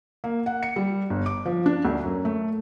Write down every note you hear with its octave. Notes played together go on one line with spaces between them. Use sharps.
A#3
F#5
C#7
G3
G1
D6
F3
D4
D2
F#2
A3